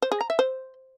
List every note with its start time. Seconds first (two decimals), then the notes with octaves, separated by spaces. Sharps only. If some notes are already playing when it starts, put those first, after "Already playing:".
0.02 C5
0.12 G#4
0.21 A#5
0.30 E5
0.39 C5